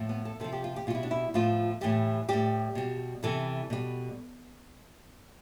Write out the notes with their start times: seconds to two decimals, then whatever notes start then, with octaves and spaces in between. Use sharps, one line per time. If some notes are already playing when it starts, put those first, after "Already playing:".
Already playing: A2 F3
0.09 B3
0.25 A4
0.40 C3 F3 A4
0.52 G4
0.64 F4
0.76 G4
0.87 B2 F4
0.90 G3 E4
1.03 D4
1.11 E4
1.34 A2 F3 F4
1.81 A2 E3 G3 G4
2.29 A2 G3 G4
2.75 B2 G3
3.23 C3 E3 G3 A4
3.70 B2 G3